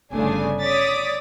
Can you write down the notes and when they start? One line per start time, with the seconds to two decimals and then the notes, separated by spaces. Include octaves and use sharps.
0.12 G1 C#3 A3 D4 G#5
0.60 C#5 D5 D6 D#6 A6 B6